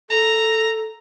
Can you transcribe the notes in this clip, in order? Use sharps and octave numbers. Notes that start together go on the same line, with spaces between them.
A4 A#5